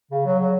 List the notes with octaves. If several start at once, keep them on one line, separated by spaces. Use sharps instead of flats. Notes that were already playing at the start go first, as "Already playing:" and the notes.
C#3
F#3
F#3